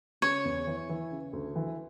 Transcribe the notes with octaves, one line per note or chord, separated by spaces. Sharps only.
C#3 C#5
E2
E3
E3
C#3
D2
E3